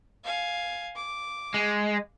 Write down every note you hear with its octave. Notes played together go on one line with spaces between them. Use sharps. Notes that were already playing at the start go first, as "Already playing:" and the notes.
F5 G#5
D6
G#3